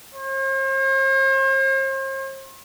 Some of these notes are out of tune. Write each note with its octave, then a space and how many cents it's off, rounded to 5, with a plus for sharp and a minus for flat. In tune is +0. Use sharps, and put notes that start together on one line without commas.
C5 +45